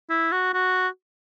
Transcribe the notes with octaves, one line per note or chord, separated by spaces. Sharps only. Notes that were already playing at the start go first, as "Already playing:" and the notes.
E4
F#4
F#4